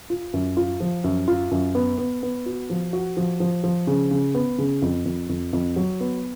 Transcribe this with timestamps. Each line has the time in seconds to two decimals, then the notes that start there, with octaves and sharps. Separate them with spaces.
0.10 F4
0.33 F#2
0.57 F4
0.80 F3
1.04 F#2
1.28 F4
1.51 F#2
1.75 B3
1.98 B3
2.23 B3
2.46 F#4
2.70 F3
2.93 F#4
3.17 F3
3.40 F3
3.64 F3
3.87 C#3
4.11 C#3
4.35 B3
4.58 C#3
4.82 F2
5.05 F2
5.29 F2
5.53 F2
5.76 F#3
6.00 B3